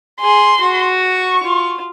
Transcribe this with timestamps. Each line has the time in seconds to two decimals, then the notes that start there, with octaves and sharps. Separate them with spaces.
0.21 G#4 C6
0.61 F#4
1.02 C#6
1.44 F4